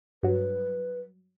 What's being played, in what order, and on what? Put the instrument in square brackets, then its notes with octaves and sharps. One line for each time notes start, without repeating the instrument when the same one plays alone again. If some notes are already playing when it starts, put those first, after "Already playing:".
[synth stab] G2 F#3 [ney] B4